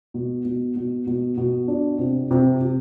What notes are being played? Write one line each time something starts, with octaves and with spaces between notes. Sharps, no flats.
B2
B2
B2
B2
B2
D4
C3
C3
C3